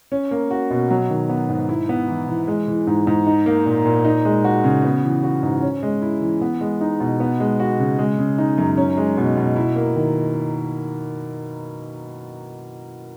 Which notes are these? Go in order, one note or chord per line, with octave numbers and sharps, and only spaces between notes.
C#4
A#3
F#4
B2
F#3
D#3
B3
G#2
E4
B3
E3
E3
G#3
E3
G#2
G#2
D#4
A#3
A#2
A#2
D#4
G#3
F#4
C#3
B3
E3
F#4
G#2
C#4
G#3
E4
E3
B3
G#3
D#4
B2
B3
G#3
F#4
C#3
G#3
C#3
D#4
F#2
C#4
G#3
B2
B2
E4
A#3
D#3